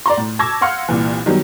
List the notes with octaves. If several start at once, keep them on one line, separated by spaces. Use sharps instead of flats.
D5 A#5 C6
A2
A5 C#6 D6 E6 G#6 A#6
F5 F#5 C6 F6 C#7
C2 A#2 E3
D#3 F#3 G3 B3 G4